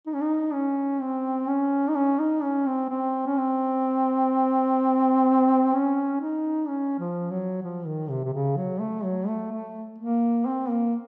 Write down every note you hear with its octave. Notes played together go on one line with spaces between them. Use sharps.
D#4
C#4
D#4
C#4
C4
C#4
D#4
C#4
D#4
C#4
C4
C4
C#4
C4
C#4
D#4
C#4
F3
F#3
F3
D#3
C3
C3
C#3
F#3
A3
F#3
A3
A3
A#3
C4
A#3